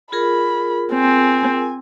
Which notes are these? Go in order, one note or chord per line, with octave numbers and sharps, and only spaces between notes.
F4 G#4 A#4 B5
C4 G#5